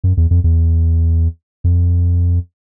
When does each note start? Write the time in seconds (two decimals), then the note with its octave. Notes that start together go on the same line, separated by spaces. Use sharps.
0.04 F#2
0.17 E2
0.31 F2
0.44 E2
1.64 F2